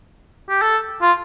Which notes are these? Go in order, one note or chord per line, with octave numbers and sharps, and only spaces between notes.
G4
A4
F4